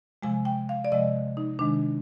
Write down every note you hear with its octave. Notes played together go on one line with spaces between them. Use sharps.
C3 F3 G#3 G#5
G5
F5
D5
C3 F3 G#3 D#5
D#4
C3 D#3 G#3 D4